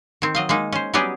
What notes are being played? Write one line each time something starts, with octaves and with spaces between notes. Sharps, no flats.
D#3 C4
F#3 D#5 F5
G#3 A#3 D#4
C#4 C5
F#3 G3 B3 C#4 G4 G#4